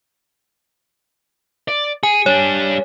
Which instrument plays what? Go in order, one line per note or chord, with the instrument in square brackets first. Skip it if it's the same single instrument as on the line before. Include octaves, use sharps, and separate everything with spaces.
[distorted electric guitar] D5
[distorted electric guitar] G#4 [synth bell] G#5
[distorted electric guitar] G3 D4 [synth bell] C#5